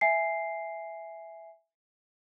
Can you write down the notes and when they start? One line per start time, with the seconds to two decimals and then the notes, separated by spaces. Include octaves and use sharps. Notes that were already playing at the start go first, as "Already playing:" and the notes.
0.01 E5 G#5 C7